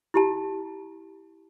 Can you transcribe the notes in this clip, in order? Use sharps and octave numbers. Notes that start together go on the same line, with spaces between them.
E4 G4 A5